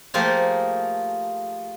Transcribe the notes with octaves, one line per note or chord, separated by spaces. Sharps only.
F3 A3 A#3 F4 G4 G#4